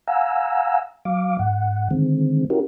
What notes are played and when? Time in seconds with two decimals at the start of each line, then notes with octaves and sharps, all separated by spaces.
0.08 F5 F#5 G#5 A#5 E6
1.05 F#3 F5 D6
1.39 G#2 F#5
1.91 D3 D#3 G#3 C4
2.50 C#4 E4 F#4 G4 A#4